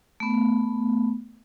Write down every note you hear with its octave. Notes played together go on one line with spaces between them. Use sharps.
A3 B3